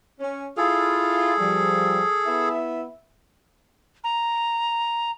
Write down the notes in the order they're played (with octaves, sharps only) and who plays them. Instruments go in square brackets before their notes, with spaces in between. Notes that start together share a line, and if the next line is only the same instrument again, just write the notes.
[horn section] C#4
[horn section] E4 F4 [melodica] G#4 A4
[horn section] F3 G3
B3 E4 E5
[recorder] A#5